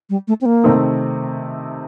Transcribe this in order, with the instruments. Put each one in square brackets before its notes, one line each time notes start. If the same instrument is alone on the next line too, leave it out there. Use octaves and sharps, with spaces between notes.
[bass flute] G3
A3
C4
A#3
[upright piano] C3 D#3 A3 C4 D#4